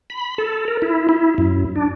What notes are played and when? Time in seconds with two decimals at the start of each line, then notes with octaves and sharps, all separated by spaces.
0.10 B5
0.38 A4
0.68 A#4
0.82 E4
1.09 E4
1.38 F#2
1.76 D4